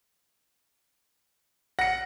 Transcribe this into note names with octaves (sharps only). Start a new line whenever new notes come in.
F#5 A#6 C#7